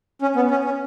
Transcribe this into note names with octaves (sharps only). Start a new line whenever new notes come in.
C#4
B3
C#4
C#4